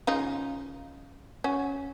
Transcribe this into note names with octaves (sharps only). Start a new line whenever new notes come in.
C#3 D#4 F4
C#4 F#4